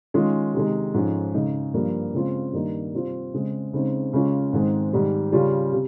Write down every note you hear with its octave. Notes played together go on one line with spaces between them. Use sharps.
D#3 G#3 C#4 F4
C3 D#3 G#3
G#2 F3 G#3 C#4
C#3 G#3 D#4
G2 F3 A#3
C#3 G#3 C4 F4
G2 D#3 A#3 D#4
C3 G3 C4 F4
C#3 G#3 C4
C#3 G#3 C4 D#4
C#3 G#3 C#4 F4
G#2 D#3 G#3 C4
G#2 D#3 G3
C#3 G3 C#4 F4
C3